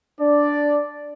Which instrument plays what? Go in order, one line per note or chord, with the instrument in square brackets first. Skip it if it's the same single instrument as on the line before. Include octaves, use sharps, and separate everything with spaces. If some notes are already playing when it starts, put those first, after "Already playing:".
[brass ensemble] D4 D5